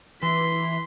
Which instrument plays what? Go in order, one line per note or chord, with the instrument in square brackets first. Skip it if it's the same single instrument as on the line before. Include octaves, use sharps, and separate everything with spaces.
[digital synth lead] E3 [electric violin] C6 B6